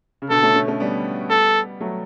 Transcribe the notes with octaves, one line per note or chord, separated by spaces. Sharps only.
C#3
B2 D3 A4
A3 C#4
A3 C#4
A3 C#4
G3 B3
A4
F#3 A3